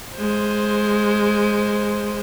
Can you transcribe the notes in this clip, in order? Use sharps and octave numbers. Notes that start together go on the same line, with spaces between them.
G#3 C5